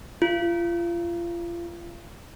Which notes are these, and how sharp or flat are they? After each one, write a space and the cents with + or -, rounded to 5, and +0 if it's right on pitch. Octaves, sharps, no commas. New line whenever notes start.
F4 -30